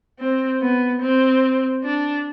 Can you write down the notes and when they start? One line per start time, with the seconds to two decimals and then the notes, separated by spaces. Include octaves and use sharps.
0.20 C4
0.62 B3
1.02 C4
1.85 D4